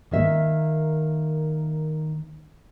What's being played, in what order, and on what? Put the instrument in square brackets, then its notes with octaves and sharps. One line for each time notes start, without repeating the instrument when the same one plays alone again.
[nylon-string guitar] D#3 A#3 E5